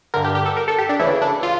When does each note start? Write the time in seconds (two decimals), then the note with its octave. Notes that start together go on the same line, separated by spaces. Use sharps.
0.14 G2 D3 A#4
0.24 G4
0.35 G4
0.46 A4
0.57 A#4
0.68 A4
0.78 G4
0.89 D4
0.99 D2 C#3 E3 E4
1.22 D4
1.43 F4